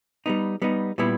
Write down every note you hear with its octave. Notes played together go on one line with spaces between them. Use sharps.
G3 B3 D#4
G3 B3 D#4
A#2 G3 B3 E4